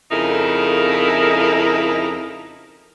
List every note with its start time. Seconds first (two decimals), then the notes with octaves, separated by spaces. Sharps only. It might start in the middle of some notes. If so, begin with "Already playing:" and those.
0.11 F2 C#3 D#4 E4 A4 A#4